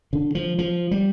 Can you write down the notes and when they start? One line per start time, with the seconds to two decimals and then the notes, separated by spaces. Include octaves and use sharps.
0.13 D3
0.35 F3
0.58 F3
0.91 G3